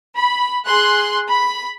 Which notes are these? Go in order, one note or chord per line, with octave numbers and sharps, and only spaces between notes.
B5
G#4 C6 F#6
B5